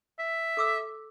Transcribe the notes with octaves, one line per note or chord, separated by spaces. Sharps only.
E5
A4 D6 E6